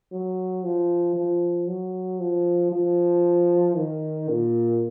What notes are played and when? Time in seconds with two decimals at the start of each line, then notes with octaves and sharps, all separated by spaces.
0.12 F#3
0.64 F3
1.16 F3
1.67 F#3
2.20 F3
2.72 F3
3.76 D#3
4.29 A#2